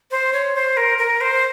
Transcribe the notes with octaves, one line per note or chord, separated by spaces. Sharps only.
C5
C#5
C5
A#4
A#4
C5